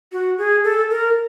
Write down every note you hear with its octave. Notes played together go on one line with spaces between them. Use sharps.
F#4
G#4
A4
A#4